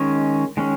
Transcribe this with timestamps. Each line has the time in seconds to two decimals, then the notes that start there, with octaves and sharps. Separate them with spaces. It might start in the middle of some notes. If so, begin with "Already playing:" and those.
Already playing: D#3 G#3 C#4
0.57 D#3 G#3 C#4